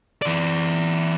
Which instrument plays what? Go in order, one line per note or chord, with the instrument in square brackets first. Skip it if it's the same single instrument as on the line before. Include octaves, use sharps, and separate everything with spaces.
[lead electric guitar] E3 D5